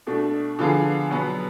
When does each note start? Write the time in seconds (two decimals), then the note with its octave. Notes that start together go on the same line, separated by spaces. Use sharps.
0.07 B2 A3 D4
0.59 D3 F3 B3 F4 G#4
1.11 B2 F#3 B3